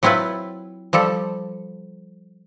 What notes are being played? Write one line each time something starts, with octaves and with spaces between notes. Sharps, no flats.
F#3 C4 E4 F4 B4
F3 G3 A4